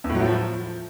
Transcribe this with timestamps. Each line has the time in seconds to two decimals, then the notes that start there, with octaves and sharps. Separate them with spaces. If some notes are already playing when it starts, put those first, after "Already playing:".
0.04 E2
0.09 A2
0.15 F#3
0.20 A2
0.26 F3